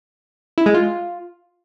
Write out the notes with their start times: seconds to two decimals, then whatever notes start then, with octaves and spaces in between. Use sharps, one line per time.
0.58 E4
0.66 G#3
0.74 F4